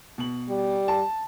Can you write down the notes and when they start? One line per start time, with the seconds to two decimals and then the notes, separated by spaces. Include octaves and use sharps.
0.18 B2 F#7
0.49 G3
0.88 A5